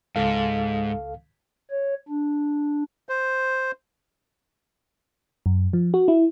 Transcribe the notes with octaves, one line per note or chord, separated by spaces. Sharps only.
C#2 G#2 A4 F5
C#5
D4
C5
F#2
F3
F#4
E4